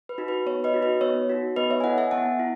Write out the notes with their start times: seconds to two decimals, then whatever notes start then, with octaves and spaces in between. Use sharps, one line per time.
0.09 B4
0.18 D#4 F#4
0.28 B4
0.46 B3 C#5
0.64 B4 D#5
0.74 D#4 F#4
0.82 B4 D#5
1.01 B3 C#5
1.29 D#4 F#4
1.56 B3 B4 D#5
1.71 C#5 E5
1.80 G#5
1.84 E4 A4 D#5 F#5
1.98 E5 G#5
2.11 B3 F#5 A5
2.39 E4